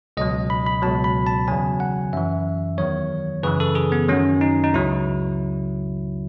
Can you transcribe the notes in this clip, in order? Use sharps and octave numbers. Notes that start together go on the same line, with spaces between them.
C#2 B2 F#3 D#5
B5
B5
C#2 B2 F#3 A5
B5
A5
E2 C#3 F#3 G#5
F#5
F#2 E3 E5
E2 D#3 F#3 C#5
F#2 C#3 E3 B4
A4
G#4
B3
F#2 D#3 F#3 C#4
D#4
D#4
C#2 C#3 F#3 E4